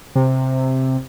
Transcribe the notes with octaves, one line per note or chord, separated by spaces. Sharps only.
C3